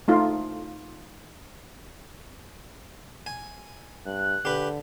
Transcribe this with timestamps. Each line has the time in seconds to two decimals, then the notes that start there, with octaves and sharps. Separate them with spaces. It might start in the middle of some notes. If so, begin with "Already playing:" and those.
0.08 A3 D#4 F4
3.26 G#5
4.06 G2 F#6
4.45 D3 G4 B4